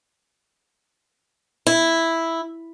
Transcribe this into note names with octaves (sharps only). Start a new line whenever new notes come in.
E4